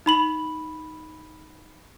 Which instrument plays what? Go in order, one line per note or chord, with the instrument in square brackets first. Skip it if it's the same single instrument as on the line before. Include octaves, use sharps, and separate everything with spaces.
[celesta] D#4 B5 F#7